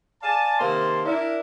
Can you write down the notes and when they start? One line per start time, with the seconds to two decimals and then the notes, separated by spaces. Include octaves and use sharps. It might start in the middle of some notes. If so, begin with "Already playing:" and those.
0.22 D5 F5 G#5 A5
0.59 C3 D#3 A#3 F5 A5 C6
1.04 D4 E4 A#4